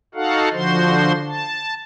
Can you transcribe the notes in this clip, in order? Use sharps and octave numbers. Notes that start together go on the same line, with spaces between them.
D#4 F#4 A4 F5 F#5
D3 F3 F#4 C5 C6
A5